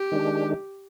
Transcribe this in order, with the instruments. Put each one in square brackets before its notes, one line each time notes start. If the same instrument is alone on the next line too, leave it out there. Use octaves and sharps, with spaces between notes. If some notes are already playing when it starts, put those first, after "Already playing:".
Already playing: [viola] G4
[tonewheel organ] D#3 G#3 D4